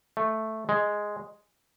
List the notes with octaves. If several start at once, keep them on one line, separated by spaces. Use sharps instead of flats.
A3
G#3